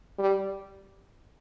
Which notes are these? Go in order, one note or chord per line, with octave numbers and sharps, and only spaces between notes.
G3